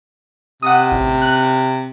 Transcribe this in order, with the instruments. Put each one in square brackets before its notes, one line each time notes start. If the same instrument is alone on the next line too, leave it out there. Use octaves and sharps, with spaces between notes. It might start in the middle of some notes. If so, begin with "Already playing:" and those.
[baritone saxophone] C3 [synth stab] F#5 D#6
[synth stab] A1
F#6